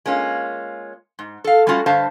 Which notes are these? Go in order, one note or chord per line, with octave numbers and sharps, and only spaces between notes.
G#3 A#3 C#4 F4
G#2
A4 F5
G3 A3 C#4 F4 F#4
G2 D3 C5 E5 F5 A5